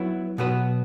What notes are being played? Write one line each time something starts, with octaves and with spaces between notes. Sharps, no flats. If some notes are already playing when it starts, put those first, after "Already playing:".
Already playing: F#3 B3 E4
B2 F#3 B3 F#4 B4